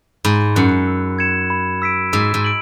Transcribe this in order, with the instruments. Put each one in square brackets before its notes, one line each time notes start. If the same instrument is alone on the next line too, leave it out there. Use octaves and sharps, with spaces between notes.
[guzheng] G#2 [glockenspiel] B5
[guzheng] F#2 [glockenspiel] F#6 C#7
[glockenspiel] E6
G#6 C#7 E7
B5
E6 B6 D7
[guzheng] G#2 [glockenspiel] E6
[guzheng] G#2
[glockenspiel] D7 F#7